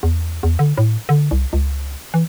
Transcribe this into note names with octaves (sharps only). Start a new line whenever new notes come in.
E2
E2
D3
A2
D3
C2
C#2
E3